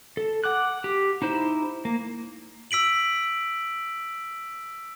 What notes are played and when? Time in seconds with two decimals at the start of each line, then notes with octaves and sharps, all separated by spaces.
0.17 A4
0.44 F#5 D6 F#6
0.84 G4
1.22 D#4 E4 C5
1.85 A#3
2.71 E6 B6 D7 F#7